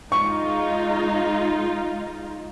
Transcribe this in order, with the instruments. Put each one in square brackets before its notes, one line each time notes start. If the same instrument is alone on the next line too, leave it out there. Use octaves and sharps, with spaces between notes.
[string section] G#3 D#4 F4 [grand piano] C#6